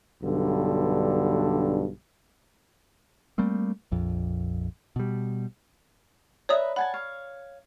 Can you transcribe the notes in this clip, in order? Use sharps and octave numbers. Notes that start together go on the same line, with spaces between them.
B1 G2 D3
G3 A3 A#3 C4
A#1 F2
B2 G3
B4 C#5 D5 E5 A#5 D#6
F#5 G#5 A5 B5
C#5 F5